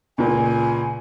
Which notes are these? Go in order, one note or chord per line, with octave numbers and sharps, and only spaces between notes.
C#2 A#2 G#5